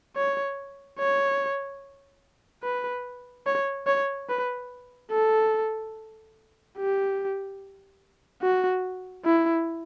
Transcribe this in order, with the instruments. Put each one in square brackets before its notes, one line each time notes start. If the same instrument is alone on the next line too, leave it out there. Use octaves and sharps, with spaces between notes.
[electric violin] C#5
C#5
B4
C#5
C#5
B4
A4
G4
F#4
E4